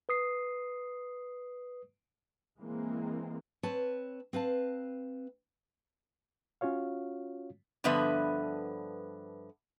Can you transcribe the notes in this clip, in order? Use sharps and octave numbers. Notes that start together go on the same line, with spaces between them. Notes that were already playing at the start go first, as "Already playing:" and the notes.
B4 D#6 C7
E3 G#3 A#3 C4
C4 B4 C#5 A5
C4 B4 F5 A5
C#4 F4 F#4 C#5 F5
G2 D3 F3 B3 B4 E5